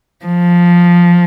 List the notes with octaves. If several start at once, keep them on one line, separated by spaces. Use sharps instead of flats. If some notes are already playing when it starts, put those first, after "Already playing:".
F3